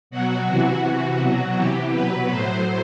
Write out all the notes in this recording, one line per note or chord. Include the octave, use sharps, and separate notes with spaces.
B2 F#3 F#4
C3 E3
C3 E3 F#4
B2 F#3 F#4
C3 E3 G4
B2 F#3 B4
A2 F#3 C5